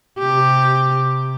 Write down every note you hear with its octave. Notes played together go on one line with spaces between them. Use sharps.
C3 G4